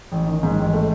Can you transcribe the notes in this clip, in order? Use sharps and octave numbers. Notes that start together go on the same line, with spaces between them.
A1
D#3
G#2
A1
A3